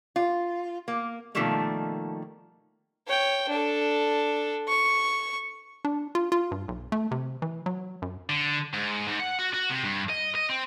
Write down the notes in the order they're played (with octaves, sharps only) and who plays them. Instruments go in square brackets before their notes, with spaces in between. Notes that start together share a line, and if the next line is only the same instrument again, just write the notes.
[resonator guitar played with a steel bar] F4
A#3
B2 D#3 F3 G3 A3 A#3
[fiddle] C#5 G5
D4 A4
C#6
[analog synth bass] D4
F4
F4
G2
B1
A3
C3
E3
F#3
F#2
[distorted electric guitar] D3
G#2
G#2
F#5
F#4
F#4
C3
G2
D#5
D#5
C4